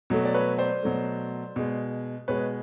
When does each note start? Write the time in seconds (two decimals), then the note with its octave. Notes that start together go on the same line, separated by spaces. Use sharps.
0.10 B2 F#3 A3
0.25 D5
0.35 B4 C#5
0.59 C5 D5
0.83 B2 F#3 A3
1.56 B2 G#3
2.28 B2 G#3 B4 C#5